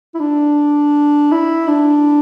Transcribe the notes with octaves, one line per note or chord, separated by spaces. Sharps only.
E4
D4
E4
D4